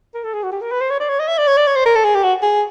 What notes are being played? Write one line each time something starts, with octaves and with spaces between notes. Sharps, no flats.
A#4
A4
G#4
F#4
G4
A#4
B4
C5
C#5
D5
C#5
D#5
E5
D5
C#5
D5
C#5
C5
A#4
A4
G#4
G4
F#4
G#4